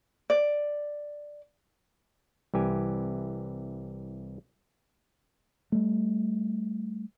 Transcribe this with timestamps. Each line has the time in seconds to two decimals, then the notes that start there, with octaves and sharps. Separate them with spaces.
0.30 D5
2.54 C2 E3 G4 G#5
5.72 G3 A3